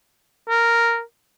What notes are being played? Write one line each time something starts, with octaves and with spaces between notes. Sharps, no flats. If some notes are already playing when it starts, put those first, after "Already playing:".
A#4